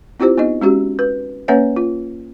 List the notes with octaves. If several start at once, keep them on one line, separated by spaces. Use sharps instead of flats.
C4 E4 F4 G4 C5
B3 D#4 D#5
G#3 C#4 F#4 G4
B4
A#3 C#4 B4 C#5 E5 F#5
F4